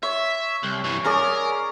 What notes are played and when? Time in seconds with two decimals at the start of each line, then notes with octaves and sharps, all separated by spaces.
0.03 C#5 E5
0.63 C2
0.84 G2 E3
1.05 C#4 G#4 A#4 D5